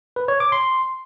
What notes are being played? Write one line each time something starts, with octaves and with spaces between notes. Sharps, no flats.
B4
C#5
D6
C6